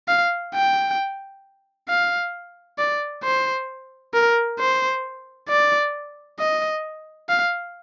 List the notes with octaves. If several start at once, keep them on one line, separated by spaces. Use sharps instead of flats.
F5
G5
F5
D5
C5
A#4
C5
D5
D#5
F5